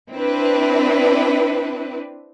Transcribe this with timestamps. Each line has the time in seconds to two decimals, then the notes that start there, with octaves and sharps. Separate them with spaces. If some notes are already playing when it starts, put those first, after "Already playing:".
0.11 C4 D4 E4 B4